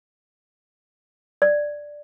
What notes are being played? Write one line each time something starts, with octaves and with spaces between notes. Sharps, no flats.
D5